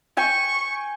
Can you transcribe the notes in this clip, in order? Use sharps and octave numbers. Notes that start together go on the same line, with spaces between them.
G5 G#5 C#6